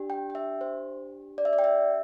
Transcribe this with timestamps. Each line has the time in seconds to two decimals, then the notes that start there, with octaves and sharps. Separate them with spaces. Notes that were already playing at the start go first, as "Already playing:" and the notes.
Already playing: D4 G4
0.10 G5
0.30 G5
0.35 E5
0.61 C5
1.38 D5
1.45 E5
1.53 D5
1.59 G5
1.64 E5